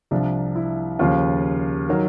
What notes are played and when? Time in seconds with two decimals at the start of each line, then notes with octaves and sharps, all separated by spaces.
0.11 C2 C3 F3 D4
0.56 E4
0.99 D#2 C#3 F3 F4
1.89 D#3 F#3